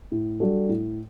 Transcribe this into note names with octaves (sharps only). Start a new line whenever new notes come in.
A2
G3 D4 F#4 A4
A2